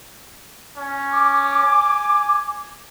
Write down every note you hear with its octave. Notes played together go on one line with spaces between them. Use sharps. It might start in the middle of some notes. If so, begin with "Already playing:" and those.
C#4
D6
G#5